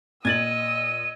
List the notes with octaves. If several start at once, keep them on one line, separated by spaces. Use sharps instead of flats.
A#2 D#5 E6 G#6 A6 D#7 F#7